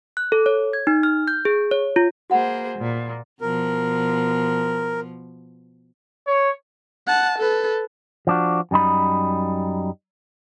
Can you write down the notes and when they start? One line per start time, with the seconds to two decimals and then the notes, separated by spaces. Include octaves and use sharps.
0.17 F#6
0.32 A4
0.46 C#5
0.73 G#6
0.87 D#4
1.03 F6
1.28 G6
1.45 G#4
1.71 C#5
1.96 F4
2.30 A#3 F#4 G#4 C5 F#5 B5
2.78 A#2
3.41 B2 F3 A#4
6.27 C#5
7.07 F#5 A5
7.39 A4 B4
8.27 F3 D4 F#4
8.71 F#2 G3 D#4 B5